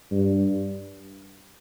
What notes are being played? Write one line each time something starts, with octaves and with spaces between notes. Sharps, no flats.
G2